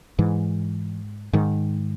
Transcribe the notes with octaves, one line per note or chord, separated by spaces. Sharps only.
G#2 E3
G#2 D#3